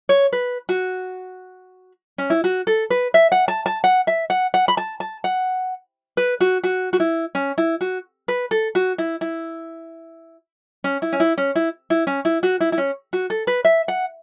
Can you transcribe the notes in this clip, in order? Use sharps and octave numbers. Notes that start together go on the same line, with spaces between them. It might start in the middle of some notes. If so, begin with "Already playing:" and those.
C#5
B4
F#4
C#4
E4
F#4
A4
B4
E5
F#5
A5
A5
F#5
E5
F#5
F#5
B5
A5
A5
F#5
B4
F#4
F#4
F#4
E4
C#4
E4
F#4
B4
A4
F#4
E4
E4
C#4
E4
C#4
E4
C#4
E4
E4
C#4
E4
F#4
E4
E4
C#4
F#4
A4
B4
E5
F#5